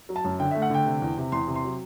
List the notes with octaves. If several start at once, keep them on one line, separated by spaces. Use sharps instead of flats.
F#3
A5
F#2
D3 G5
E5
A3
F#5
D3 G5
C3
E2
C3
E2 C6
C3
C6
F#3